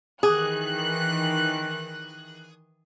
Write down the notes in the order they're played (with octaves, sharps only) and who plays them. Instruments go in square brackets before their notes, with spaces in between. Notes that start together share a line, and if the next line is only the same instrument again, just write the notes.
[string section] D#3 E3 F#6 [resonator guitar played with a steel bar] G#4